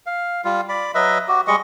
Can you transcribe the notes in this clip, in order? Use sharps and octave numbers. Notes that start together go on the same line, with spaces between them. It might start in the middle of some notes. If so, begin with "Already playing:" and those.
F5
G3 F4
D5 B5
F#3 B4 D#5 E5
F#4 G4
G3 G#3 D#5 C#6